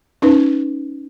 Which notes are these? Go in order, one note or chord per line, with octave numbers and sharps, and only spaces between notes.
C#4 D#4 B4